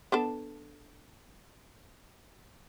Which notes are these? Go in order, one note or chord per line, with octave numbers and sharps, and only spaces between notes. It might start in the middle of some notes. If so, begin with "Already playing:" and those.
B3 D4 A4